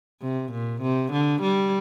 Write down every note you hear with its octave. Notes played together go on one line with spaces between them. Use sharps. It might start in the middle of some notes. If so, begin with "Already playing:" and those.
C3
A#2
C3
D3
G3